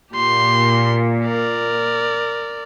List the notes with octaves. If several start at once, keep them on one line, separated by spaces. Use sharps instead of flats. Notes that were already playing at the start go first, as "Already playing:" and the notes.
A#2 G4 C6
A#4 D5